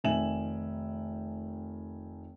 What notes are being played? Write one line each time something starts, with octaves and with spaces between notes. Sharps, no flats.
F1 D#3 E5 G#5 E7 F#7